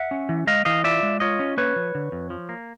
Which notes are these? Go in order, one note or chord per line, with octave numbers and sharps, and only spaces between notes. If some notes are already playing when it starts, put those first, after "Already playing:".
Already playing: E5 F#5
C#4
E3
G#3 D#5 F5
E3 D#5 F5
F4 D5 E5
G#3
F4 C#5 D#5
C#4
A#3 B4 C#5
F3
D3
F2
F3
A#3